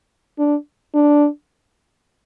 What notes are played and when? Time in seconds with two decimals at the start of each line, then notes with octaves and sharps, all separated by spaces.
0.38 D4
0.94 D4